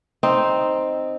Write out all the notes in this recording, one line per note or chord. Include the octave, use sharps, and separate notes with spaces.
C4 D#4